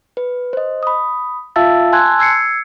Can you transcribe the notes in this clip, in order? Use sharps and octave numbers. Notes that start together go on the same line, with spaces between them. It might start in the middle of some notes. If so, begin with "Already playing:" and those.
B4
C5 D#5
B5 D#6
F4 E5 F5 A5 E6 A6
G#5 A5 C6 E6 F#6 G#6
E6 G#6 C7 C#7